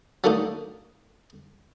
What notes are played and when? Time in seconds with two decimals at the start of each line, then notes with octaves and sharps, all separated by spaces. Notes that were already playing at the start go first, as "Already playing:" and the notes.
0.24 F#3 A3 A#3 D4 D#4